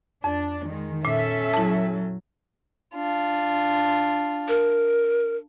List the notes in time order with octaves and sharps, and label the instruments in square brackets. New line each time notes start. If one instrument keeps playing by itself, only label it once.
[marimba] F2 [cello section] D4
[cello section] D#3 G#3
[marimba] A#2 [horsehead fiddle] C#4 A4 [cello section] E5
[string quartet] F#3 [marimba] E4 A5
[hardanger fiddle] D4 F4
[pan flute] A#4